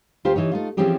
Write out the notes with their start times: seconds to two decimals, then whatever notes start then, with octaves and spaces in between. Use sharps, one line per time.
0.25 D2 F4 G4 C5
0.36 E3 D#4 C#5
0.51 A3 D#4 F4
0.77 E3 F3 C4 C#4 G4 G#4